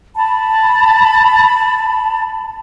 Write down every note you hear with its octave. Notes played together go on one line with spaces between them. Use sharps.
A5 B5